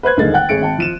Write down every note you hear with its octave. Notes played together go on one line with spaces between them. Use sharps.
B4 C5 F#6 G#6
D#1 D3 G#3 A#3 D#4 A6
F#5 G5 F#6
G#1 G#4 C#5 C#7 D7
G#1 G5 A5
F3 D#7 E7